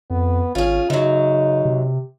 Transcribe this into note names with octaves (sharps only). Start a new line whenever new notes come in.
F2 B3
G#1 C#4 F4 G#4
F#2 C#3 F#3 D#4
C3